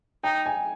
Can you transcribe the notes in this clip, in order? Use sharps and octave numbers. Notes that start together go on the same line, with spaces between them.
D#4 G5
G#5